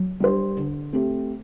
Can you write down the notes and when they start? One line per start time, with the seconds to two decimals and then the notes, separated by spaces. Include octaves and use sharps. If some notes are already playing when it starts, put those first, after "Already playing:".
Already playing: F#3
0.20 G3 D4 G4 C5
0.57 D3
0.93 A3 C4 G4